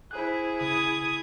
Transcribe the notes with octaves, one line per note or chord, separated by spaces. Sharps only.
E4 G#4 C5 F#6
C#3 D#6 G#6